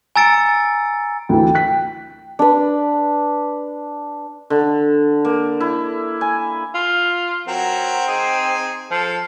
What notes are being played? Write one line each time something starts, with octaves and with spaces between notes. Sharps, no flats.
G#5 A#5 E6 A6 C#7 D7
D2 E3 G5
F#6 B6
D4 B4
D3
A#3
E4
G#5
F4
F#3 C4 F#4 A#4
D#4 G#4
F3 A4